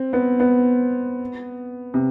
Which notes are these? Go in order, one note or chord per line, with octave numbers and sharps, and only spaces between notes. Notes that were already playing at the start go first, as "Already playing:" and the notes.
Already playing: C4
B3
B3
C3